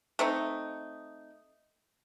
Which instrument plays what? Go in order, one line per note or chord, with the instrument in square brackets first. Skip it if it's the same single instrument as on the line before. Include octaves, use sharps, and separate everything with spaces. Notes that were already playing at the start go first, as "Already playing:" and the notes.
[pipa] A3 C4 D#4